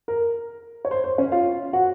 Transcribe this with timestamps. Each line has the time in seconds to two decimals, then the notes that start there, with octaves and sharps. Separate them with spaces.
0.08 A#4
0.85 C#5
0.91 C5
1.04 C5
1.18 C#4 C#5
1.32 F4 F5
1.73 F#4 F#5